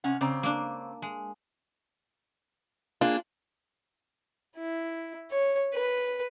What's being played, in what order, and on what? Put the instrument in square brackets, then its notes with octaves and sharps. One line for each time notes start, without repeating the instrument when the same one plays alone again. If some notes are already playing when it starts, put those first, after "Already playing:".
[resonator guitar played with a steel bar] C3 C#4 F#5
[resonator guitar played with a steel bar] C#3 C4 A#5 [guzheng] D5
[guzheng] A#3 D4
G#3
[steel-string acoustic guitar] A#3 D4 G#4 [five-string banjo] F4
[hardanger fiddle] E4
C#5
B4